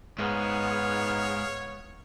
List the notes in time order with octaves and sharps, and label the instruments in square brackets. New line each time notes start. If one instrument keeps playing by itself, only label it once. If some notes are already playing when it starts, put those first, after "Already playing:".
[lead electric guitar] G#2 [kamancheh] B3 F6 [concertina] G#4 F5 [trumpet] C#5